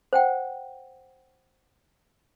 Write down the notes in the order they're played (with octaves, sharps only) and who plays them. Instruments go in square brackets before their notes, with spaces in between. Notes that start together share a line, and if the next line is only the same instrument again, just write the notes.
[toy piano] C5 F#5 G5